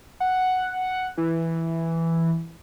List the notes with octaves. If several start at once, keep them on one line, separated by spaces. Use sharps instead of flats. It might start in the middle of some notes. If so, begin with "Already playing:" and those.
F#5
E3